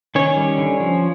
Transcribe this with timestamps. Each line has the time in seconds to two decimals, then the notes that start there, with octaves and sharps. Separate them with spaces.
0.15 D#3 C#4 C#5
0.37 G3
0.58 D3
0.80 F3